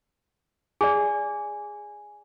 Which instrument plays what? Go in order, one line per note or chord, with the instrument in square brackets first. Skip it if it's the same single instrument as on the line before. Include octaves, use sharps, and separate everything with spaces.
[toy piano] G#4 D5 [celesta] G#5